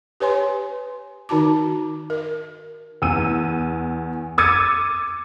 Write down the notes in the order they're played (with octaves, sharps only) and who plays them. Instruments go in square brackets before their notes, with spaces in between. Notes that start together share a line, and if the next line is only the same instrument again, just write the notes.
[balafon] G4 B4 C#5 G#5 C6
D#3 D#4 F#4 A5 D6
A#4
[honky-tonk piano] E2 E6 D#7
D6 E6 G#6 A6 C#7 D#7